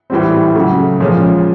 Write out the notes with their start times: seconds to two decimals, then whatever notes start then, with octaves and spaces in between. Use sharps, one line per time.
0.10 A2 E3 G3 C4
0.55 C#3 F#3 A3
1.00 A#2 F3 G#3 C#4